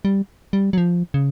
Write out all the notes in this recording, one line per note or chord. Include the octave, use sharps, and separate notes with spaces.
G3
G3
F#3
F3
C#3